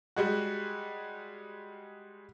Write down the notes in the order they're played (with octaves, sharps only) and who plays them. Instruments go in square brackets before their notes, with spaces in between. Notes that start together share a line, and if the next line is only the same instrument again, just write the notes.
[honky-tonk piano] G3 G#3 F#4